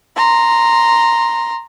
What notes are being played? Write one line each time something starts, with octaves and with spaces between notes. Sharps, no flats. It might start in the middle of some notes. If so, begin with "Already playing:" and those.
A#5 C6